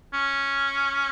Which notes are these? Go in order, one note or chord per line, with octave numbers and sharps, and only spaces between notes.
C#4